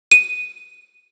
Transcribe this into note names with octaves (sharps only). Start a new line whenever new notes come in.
D#7